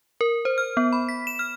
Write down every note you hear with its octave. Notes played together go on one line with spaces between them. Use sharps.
A#4
C5
F6
B3
B5
B6
E7
F6